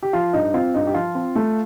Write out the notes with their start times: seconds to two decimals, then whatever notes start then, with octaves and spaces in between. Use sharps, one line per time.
0.03 G4
0.13 F3 F4
0.33 G2 D#4
0.54 C4 F4
0.74 G2 D#4
0.87 G4
0.94 F3 F4
1.15 C4
1.36 A3